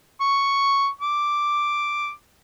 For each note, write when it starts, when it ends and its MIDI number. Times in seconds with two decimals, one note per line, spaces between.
0.21 0.87 85
1.01 2.10 86